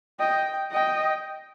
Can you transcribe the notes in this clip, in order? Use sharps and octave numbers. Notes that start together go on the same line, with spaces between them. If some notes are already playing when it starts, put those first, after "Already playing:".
D#5 G5
D#5 G5